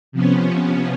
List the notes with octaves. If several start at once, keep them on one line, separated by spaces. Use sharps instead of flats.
C3 F3 B3 C#4